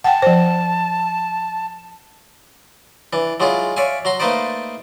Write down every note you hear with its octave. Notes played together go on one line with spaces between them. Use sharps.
F#5 G5 A5
F3 C5
E3 D4
F#3 G#3 D4 E4 F4
C#5 D5 E5 F5 G#5
F#3 A#5 C6
A3 A#3 D#4 B4 C5 D5